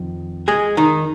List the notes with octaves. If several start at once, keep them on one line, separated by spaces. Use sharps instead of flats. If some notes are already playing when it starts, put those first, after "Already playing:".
Already playing: F2 D#3
G#3 G#4
D#3 D#4